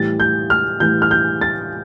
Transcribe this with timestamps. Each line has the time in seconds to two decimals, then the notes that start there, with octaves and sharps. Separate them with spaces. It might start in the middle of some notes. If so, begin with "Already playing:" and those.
Already playing: A2 E3 G3 A6
0.20 G6
0.50 F6
0.80 A2 E3 G3 G6
1.02 F6
1.11 G6
1.41 A6